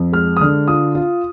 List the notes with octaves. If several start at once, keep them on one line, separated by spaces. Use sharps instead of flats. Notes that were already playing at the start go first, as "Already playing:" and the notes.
Already playing: F2
G#3 F6
D#6
D3 F6
F4 D#6
F4